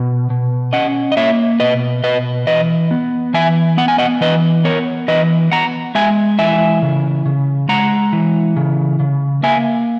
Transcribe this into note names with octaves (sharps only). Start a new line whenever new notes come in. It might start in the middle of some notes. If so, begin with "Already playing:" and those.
Already playing: B2
B2
C#4 D#5 F#5
D#5
A#3 C#5 E5
B2 B4 D#5
B2 B4 D#5
E3 B4 D#5
B3
E3 E5 G#5
B3 F#5
G#5
D#5 F#5
E3 B4 D#5
B3 A#4 C#5
E3 B4 D#5
B3 F#5 A#5
G#3 E5 G#5
E3 E5 G#5
C#3
C#3
G#3 F#5 A#5
E3
C#3
C#3
A#3 E5 G#5